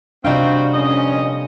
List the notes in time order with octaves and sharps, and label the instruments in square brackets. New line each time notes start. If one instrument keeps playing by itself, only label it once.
[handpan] C3 D4 [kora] G3 D#4 G5 [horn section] C4 F4 F#4
[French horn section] F2 A#2 C#4 [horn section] D#5